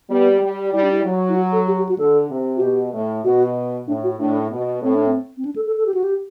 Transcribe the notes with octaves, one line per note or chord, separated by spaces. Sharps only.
G3 B3
G3
G3 E4
D4
E4
F#3
E4
F#4
A4
G4
G4
F#4
D3 A4
C3
F#4
B2 G4
A2
B2 F#4
A2 D4
F#4
A2 D4
B2
A2 C4
D4
C4
C4
D4
A4
A4
A4
G4
F#4
G4